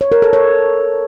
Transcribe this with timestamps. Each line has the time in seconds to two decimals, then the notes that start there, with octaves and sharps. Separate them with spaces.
0.01 C#5
0.12 A#4
0.22 A4
0.33 C#5